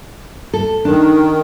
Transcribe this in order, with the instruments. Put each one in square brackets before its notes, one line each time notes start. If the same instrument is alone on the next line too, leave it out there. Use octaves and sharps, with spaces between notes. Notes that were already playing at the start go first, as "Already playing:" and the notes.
[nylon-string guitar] A4
[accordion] D#3 [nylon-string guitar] D4